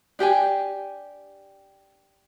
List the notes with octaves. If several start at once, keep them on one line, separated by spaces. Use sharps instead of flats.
D4 G4 G5 G#5